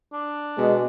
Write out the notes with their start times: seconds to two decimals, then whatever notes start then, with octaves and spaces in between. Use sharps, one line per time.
0.13 D4
0.58 B2 G#3